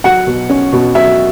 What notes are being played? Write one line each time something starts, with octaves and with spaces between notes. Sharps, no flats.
F#3 F#5
B2
C#4
B2
F#3 E5